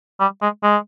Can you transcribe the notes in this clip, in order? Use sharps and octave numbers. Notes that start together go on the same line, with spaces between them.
G3
G#3
G#3